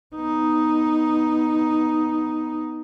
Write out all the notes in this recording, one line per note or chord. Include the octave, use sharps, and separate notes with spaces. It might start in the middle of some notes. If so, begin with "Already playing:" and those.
B3 D#4